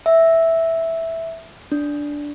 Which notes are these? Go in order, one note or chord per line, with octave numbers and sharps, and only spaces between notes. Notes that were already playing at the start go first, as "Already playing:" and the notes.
E5
D4